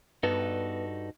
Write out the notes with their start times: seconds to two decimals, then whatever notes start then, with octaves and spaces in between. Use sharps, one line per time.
0.23 G2 B3 D#4 F#4 A4